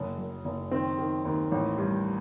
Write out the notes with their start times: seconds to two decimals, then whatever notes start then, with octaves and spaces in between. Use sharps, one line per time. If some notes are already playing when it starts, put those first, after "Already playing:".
Already playing: F#1
0.18 F#2
0.45 F#1
0.71 D#3 C4
0.99 D#3
1.25 D#2
1.51 A1
1.78 G2